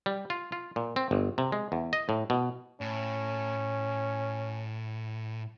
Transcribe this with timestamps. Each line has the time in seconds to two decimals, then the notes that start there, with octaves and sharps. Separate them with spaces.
0.06 G3
0.30 F4
0.52 F4
0.76 A#2
0.96 C4
1.11 G1
1.38 C3
1.52 G#3
1.72 E2
1.93 D#5
2.09 A2
2.30 B2
2.81 A2 C#4